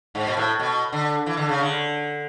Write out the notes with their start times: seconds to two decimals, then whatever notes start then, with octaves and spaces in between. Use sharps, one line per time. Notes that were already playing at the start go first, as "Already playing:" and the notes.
0.15 G#2
0.27 B2
0.37 A2
0.59 B2
0.92 D3
1.26 E3
1.37 D3
1.49 C#3
1.61 D3